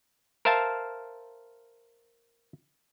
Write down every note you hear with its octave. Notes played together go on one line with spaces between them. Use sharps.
A#4 C5 E5 F5 A5